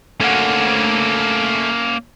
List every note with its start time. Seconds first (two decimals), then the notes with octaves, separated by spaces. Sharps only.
0.20 A3 A#3 C#4 F#5